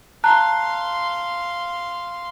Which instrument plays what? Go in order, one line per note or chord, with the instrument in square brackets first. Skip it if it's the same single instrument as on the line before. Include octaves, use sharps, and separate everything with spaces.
[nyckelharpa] F5 C6 [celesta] A5 A#5 F#6